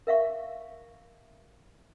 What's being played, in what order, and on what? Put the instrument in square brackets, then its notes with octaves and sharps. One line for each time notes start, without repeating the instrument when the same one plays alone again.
[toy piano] A#4 E5 F5 C#6